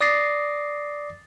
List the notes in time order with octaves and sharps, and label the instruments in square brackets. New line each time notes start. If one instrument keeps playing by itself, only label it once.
[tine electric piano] D5 D6 D#6 A6 A#6 C7